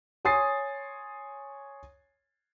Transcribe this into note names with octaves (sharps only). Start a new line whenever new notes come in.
C#5 G#5 C6 D#6 A6 C7